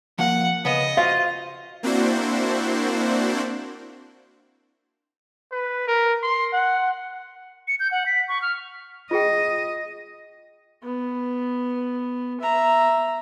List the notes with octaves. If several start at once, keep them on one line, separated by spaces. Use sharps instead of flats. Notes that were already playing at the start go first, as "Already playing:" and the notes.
F3 A#3 F#5
C#3 B3 D#5
F4 F#4 C5 E5 F5
A#3 C4 D4 E4 F#4 C5
B4
A#4
C6
F#5
C#7
G6
F#5
B6
C#6
F6
F4 G#4 D#5 G5
B3
E5 A#5